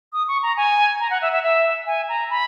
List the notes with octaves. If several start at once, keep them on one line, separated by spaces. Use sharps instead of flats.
D#6
C#6
A#5
G#5
A#5
F#5
E5
E5
E5
G#5
A#5
B5